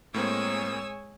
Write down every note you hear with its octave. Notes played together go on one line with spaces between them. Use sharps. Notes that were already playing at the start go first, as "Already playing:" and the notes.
A2 G#3 A#3 C4 C#5 G#5 D#6 E6